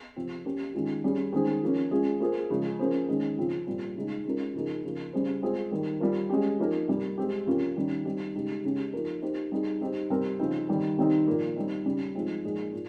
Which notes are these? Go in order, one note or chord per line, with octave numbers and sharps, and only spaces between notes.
C3 F3 C4
A#3 C#4 G4 A#4
D#3 G#3 C#4 F4
G3 C#4 G#4
D#3 G#3 C#4 G#4 C5
F3 A#3 C#4
G#3 C#4 F4 G#4
A#3 F4 G#4 C5
C#3 F3 G#3
F3 A#3 C#4 G#4 C5
D#3 G#3 C#4
C#3 F3 C4 F4
A#2 G3 C4
C#3 G#3 D#4
G#3 C#4 F4 A#4
C#3 F3 A#3 D#4 G#4
C#3 F3 A#3
C#3 G3 C#4 G#4 C5
G#3 C4 F4 G#4 C5
D#3 G3 A#3
G3 C4 F4 A#4
G#3 C#4 G4
F3 A#3 D#4 A#4
C3 G3 A#3
G#3 C4 G4
C3 F3 A#3 C#4 F4
D#3 G3 C#4
G3 C4 D#4 G4
C#3 G#3 D#4 G4
C#3 G#3 C#4 G4
F3 A#3 D#4 A#4
A#3 D#4 G4 C5
G3 C4 D#4 G#4
G3 C4 D#4 G4 C5
C3 G3 C4 G4 A#4
C#3 F3 C4 D#4
D#3 G3 C4
C3 D#3 G3 C4 D#4
A#2 F3 A#3
G3 C4 D#4
C#3 G3 C#4
F3 G#3 C4 D#4
A#2 F3 G#3 D#4 G#4
A#2